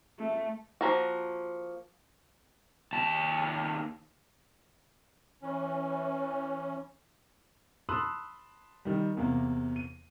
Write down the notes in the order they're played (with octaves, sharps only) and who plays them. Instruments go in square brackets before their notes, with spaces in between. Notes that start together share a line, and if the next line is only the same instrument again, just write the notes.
[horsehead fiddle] A3
[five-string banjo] F3 A#3 F#4
[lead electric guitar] D#2 A5
[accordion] E3 C#4
[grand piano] A5 B5 C6 D#6 E6 F#6
D#3 G3
E2 C3 A#3
D#7